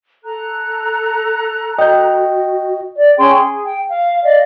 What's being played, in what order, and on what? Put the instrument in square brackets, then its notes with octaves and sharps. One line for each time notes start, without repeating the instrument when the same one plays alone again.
[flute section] A4 A#5 F#6
[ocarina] F#4 [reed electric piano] D#5 [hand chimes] G5 G6
[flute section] D5
C#4 G#4 G5 C6
G#4
G5
F5
D5 D#5 F5